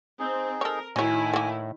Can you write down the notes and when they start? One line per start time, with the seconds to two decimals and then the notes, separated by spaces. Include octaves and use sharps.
0.19 C4 D#4 G#4
0.61 A4 A#4 C#5
0.96 A2 D#3 F#3 E4 C#5 G#5
1.33 A3 A#3